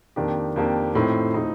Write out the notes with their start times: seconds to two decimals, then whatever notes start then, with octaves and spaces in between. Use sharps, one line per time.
0.16 F2 D#3 A#3 D4 G4
0.56 F2 D#3 A#3 D4 G4
0.95 A2 F3 C4 D#4
1.34 A2 F3 C4 D#4